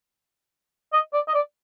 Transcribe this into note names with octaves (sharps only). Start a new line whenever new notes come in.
D#5
D5
D#5
D5